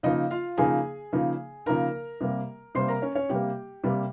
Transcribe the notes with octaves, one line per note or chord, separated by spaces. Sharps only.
C#3 F3 A#3 D#4 D#5
F4 F5
C#3 F3 A#3 D#4 G#4 G#5
C#3 F3 A#3 D#4
C#3 F3 A#3 D#4 A#4 A#5
C3 G3 A#3
C3 G3 A#3 C5 C6
A#4 A#5
C#4 C#5
C#4 C#5
C3 G3 A#3 G4 G5
C3 G3 A#3